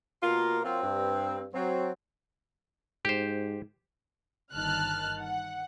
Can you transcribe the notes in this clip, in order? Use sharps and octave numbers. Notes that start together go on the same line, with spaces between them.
B2 A#3 F4 A#4
F#3 A#3 C4 F4
G2
F#3 C4
G#2 G4 C5
G1 D#3 A5 F6 F#6
F#5